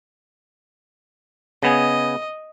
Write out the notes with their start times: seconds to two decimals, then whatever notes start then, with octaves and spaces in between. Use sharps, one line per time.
1.63 C#3 B3 D#5 G#5